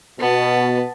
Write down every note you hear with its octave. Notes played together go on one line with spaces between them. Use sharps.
B2 B3 A5